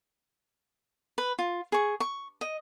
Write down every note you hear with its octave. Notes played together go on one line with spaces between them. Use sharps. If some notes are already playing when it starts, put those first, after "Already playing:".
B4
F4
G#4 C#6
C#6
D#5